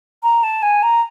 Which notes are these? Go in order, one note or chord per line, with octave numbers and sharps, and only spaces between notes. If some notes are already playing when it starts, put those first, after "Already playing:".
A#5
A5
G#5
A#5